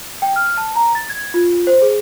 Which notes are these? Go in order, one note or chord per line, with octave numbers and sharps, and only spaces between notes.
G5
F6
A5
A#5
A6
G#6
F4
C5
G#4